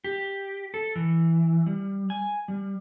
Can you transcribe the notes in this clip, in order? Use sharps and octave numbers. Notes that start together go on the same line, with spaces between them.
G4
A4
E3
G3
G#5
G3